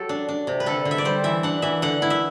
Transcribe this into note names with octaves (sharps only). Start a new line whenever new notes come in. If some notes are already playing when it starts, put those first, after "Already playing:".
Already playing: F#3 G4 A4
D4
D4
C3
B4
D3 A4
D3
E5
D5
G3 C5
E3 E5
D4 F#5
E3 E5
D3 F#5
E4
E5